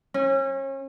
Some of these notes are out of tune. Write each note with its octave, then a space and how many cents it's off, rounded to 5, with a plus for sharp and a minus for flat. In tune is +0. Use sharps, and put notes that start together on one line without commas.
C#4 -35